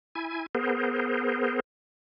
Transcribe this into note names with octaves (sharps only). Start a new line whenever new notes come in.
E4 G#5
B3 G#4 A#4 C5